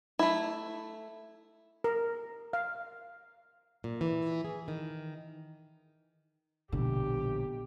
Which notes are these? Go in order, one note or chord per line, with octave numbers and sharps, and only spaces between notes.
A3 E4
A#4
F5
A#2
E3
G#4
D#3
A#1 B2 D3 G4